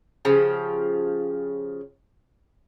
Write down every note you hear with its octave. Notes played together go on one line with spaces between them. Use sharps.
C#3 F3 G4